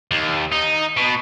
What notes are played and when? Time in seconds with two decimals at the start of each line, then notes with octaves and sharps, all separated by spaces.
0.11 D#2
0.52 D#4
0.97 B2